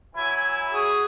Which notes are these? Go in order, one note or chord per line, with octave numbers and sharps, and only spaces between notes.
E3 F#3 E4 G#5
F#4 G#4